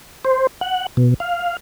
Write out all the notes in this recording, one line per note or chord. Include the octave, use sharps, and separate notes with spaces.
C5
F#5
B2
F5